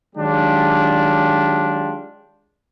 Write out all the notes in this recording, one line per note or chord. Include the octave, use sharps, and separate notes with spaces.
D#3 F#3 G#3 D4 F4 G4